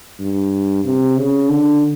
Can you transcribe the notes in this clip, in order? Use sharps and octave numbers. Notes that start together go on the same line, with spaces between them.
G2
C3
C#3
D3